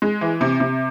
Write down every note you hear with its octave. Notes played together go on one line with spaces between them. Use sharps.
G#3
E3
C3
C3